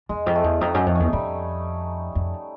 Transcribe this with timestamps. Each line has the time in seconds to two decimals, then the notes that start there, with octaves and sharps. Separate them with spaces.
0.09 E2 G#3
0.26 F2
0.35 A3
0.44 E2
0.61 F2 D#4
0.74 F#2
0.86 F2
0.95 E2 C#4
1.13 F2 G3
2.15 F2